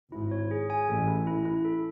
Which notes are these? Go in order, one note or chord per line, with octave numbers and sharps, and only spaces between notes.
G#1 G#2 E4
C#5
G#4
G#5
A1 A2 A4
E4
E4
E4
A4